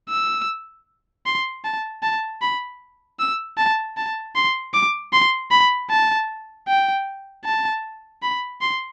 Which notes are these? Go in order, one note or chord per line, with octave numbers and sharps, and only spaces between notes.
E6
C6
A5
A5
B5
E6
A5
A5
C6
D6
C6
B5
A5
G5
A5
B5
C6